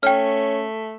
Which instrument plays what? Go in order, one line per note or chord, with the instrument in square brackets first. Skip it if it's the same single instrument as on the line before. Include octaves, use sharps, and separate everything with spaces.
[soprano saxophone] A3 [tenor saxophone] C#4 [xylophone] G5 F6